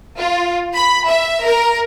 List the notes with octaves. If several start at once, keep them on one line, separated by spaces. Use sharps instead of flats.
F4
B5
E5
A#4